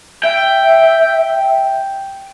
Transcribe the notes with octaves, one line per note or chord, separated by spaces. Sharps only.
E5 G5